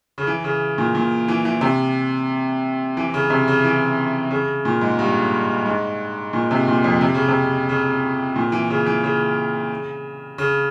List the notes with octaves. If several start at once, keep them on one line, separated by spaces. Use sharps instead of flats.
C#3
E3
C#3
A#2
A#2
E3
E3
C3
E3
C#3
C3
C#3
E3
C#3
A#2
G#2
G2
G#2
A#2
C3
A#2
F2
C3
C#3
C3
C#3
A#2
E3
C#3
E3
C#3
C#3